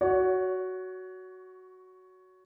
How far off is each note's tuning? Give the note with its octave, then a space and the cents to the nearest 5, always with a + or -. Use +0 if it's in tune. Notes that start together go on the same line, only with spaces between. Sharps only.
F#4 +5 C#5 +25